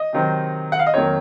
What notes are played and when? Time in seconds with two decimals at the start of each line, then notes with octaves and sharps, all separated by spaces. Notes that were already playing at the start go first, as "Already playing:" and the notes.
Already playing: D#5
0.13 C3 D#3 F#3 C4
0.72 F#5
0.79 F5
0.86 D#5
0.93 F2 D#3 F#3 A#3 C#5